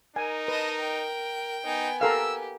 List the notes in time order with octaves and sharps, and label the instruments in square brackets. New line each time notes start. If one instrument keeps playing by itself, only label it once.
[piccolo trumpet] D#4 [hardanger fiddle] A#4 [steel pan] G#5
[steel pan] B4 [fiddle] D#5 A5
[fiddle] G5
[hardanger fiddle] B3 G#5 [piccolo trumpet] D#4
[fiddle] G4 [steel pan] A4 A#4 F5 [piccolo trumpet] E6